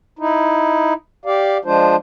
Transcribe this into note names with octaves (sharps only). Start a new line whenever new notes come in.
D#4 E4
G4 D5 F5
F3 G#3 D4 F4 C5